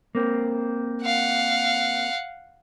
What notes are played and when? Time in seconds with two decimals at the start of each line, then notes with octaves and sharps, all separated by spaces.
0.15 A#3 C4
1.03 F5 F#5